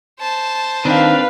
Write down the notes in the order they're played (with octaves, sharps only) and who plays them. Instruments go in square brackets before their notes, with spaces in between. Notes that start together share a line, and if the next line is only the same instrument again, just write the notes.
[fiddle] C5 A5
[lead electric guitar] D#3 [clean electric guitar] C4 D4 [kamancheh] B4 F5